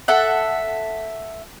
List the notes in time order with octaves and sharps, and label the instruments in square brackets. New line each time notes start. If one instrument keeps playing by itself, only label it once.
[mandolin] A4 E5 F#5